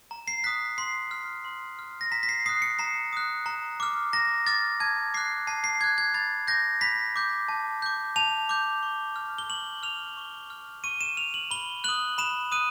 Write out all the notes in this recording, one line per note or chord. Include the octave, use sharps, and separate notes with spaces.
A#5
C7
D#6 F#6 B6
C6 C7
F6
C6
F6
A#6
A#5 B6
B6
C7
D#6 F#6 C7
C#7
A#5 C7
D#6 F#6
A#5
D6 F6
A#5 A#6
D6 F6 A6
A5 G#6
D6 F#6 C7
A5 C7
C7
D6 F#6 G#6
G#6
B5 A6
D6 G6 A#6
B5 B6
D6 G6
A5
D6 G6
A5 F7
D6 G6
C#6
F6
G7
C#6 F#7
F6 F7
C#6
F6
C#6 D#7
E7
F6 F7
F#7
B5 G7
D#6 F#6 F#7
B5 E7
D#6 F#6 D#7